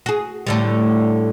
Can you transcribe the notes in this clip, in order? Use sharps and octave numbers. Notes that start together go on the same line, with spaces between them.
F#4 G#4
A2 D3 G3